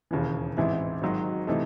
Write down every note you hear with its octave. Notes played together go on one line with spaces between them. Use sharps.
E1 D#2 C#3 E3
A1 G#2 E3 C4 E4
G#1 G#2 D#3 F#3
C3 E3 A3 D#4